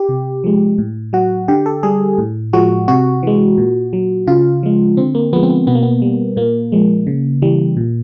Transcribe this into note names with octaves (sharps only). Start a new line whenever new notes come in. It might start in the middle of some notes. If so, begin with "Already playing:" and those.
Already playing: G4
C3
F3 G#3
A2
F#3 F#4
D3 G4
A4
G3 G#4
A2
F3 G#3 F#4
C3 F#4
E3 G#3
A#2
F#3
C#3 F4
F3 G#3
D3 C4
A#3
F3 G#3 B3
C4
B3
B2 B3
A#3
B3
G3
A#2 A#3
F3 G#3
C#3
E3 G3
A#2